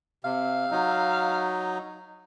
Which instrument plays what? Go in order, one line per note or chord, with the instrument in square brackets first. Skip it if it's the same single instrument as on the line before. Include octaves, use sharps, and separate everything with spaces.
[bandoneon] C3 [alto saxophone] F5
[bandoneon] F#3 D#4